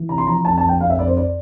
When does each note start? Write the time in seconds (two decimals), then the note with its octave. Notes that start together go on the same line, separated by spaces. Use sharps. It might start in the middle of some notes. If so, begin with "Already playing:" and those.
Already playing: E3
0.09 C3 A#5
0.18 C6
0.27 F3 A#5
0.45 F2 A5
0.58 A5
0.63 F3
0.69 G5
0.81 F2 F5
0.90 E5
0.99 F2 D5
1.08 C5
1.17 D5